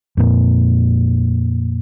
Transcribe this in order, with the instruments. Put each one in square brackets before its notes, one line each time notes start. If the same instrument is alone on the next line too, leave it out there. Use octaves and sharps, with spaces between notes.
[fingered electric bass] F2 A#2